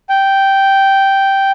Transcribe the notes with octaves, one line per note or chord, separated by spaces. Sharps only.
G5